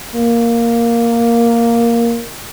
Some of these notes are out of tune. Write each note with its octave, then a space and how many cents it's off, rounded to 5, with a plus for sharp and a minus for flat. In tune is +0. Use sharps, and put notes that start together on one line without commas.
A#3 +0